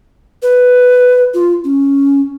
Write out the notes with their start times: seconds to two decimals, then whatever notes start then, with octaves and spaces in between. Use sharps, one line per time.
0.43 B4
1.34 F4
1.64 C#4